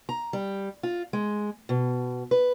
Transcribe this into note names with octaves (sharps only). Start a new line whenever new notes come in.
A#5
G3
F4
G#3
B2
B4